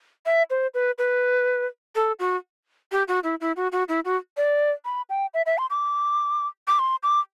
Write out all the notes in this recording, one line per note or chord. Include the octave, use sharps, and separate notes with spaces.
E5
C5
B4
B4
A4
F#4
G4
F#4
E4
E4
F#4
F#4
E4
F#4
D5
B5
G5
E5
E5
C6
D6
D6
C6
D6